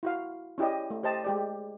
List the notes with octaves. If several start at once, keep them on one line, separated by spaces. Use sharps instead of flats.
E4 F#4 F5
C#4 E4 G4 D5 D#5
A3
G4 C5 D#5 A5
G#3 G4 D5